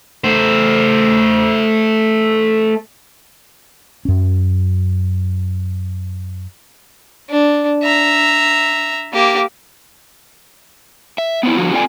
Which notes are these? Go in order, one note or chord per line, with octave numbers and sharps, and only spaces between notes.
A3 C5
F#2 C#4
D4
E5 A#5
A#3 G4
E5
B3 C4 E4
D3 F3 F#4
C4 F4 A4 D5 G5 G#5